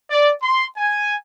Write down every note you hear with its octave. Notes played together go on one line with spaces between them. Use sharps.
D5
C6
G#5